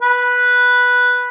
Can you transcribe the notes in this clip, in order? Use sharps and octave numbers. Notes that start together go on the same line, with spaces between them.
B4